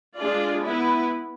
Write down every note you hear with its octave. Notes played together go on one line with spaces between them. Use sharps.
G#3 D4 F4 G#4 D5
B3 E4 B4